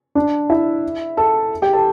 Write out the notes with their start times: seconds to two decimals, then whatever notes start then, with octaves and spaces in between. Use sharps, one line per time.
0.15 D4 D5
0.50 E4 E5
1.17 A4 A5
1.62 G4 G5
1.73 A4 A5